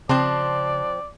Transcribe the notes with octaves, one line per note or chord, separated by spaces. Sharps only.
C#3 F3 C4 D5 A5 C6 F#6